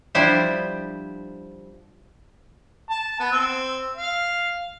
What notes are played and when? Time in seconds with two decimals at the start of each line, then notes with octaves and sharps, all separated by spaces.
0.15 F3 G3 D4 E4 C5
2.90 A5
3.19 B3
3.32 C4 E6
3.96 F5